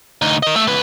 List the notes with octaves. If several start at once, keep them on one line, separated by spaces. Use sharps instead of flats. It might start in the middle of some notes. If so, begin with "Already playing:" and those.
D2 D#4
A#4 D#5
A3 E5
C#2 B4